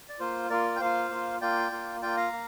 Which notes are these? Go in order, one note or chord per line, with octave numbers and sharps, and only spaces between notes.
D5
A#3 F4 C5
A#3 F4 A#4 D5
G5
A#3 F4 C5 F5
A#3 F4
A#3 F4 D5 G5
A#3 F4
A#3 F4 D5 G5
F5 A#5
A#3